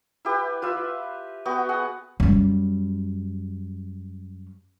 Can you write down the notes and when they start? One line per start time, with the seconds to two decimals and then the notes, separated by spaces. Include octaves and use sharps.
0.25 E4 G4 B4
0.62 F4 B4 E5
1.45 B3 F#4 G5
1.69 G#4 F#5
2.20 F#2 G3